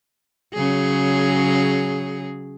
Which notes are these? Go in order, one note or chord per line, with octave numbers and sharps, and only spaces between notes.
C#3 F#3 G#4